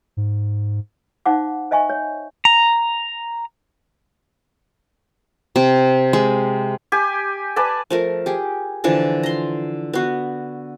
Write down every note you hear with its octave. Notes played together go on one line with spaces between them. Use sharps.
G#2
D#4 C5 F5 F#5 D6
C5 D#5 E5 G#5 C#6
C#5
A#5
C3
G#3
G4 G#5
B4 D5 G#5 A5
F3 A3 A#4
G4 G#4
D3 E3 F3 D4
A#5 C6
B3 F#4